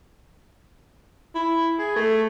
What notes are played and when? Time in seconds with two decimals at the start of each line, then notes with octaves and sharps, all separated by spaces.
1.35 E4
1.79 G#4
1.96 A3